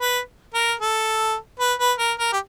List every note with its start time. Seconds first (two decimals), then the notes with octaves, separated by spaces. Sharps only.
0.01 B4
0.54 A#4
0.80 A4
1.60 B4
1.79 B4
1.99 A#4
2.19 A#4
2.33 G4